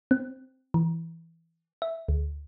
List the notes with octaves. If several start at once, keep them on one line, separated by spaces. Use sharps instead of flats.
C4
E3
E5
D2